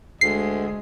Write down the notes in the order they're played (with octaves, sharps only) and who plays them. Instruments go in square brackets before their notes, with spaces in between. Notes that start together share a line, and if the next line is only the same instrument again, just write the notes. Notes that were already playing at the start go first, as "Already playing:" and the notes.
[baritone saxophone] D2 [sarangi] G#3 [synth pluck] C7